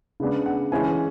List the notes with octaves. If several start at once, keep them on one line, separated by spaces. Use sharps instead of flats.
C#3 G#3 B3 D4
F#5
E3 G#3 C#4 E4 G#5